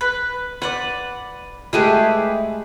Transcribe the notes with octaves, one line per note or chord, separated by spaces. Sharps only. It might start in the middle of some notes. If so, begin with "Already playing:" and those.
B4
B4 C5 D5 F#5
G#3 A3 E4 G4 G#4 B4